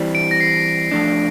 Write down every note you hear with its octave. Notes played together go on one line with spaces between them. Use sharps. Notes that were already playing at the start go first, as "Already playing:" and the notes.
Already playing: E3 G3 C4
D7
A#6
C7
F3 A3 D4